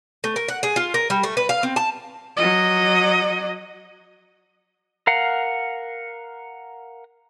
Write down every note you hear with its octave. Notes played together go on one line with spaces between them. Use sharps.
A3
A#4
F#5
G#4
F4
A#4
G3
A3
B4
F5
C4
A5
F#3 D#5
A#4 F5 F#5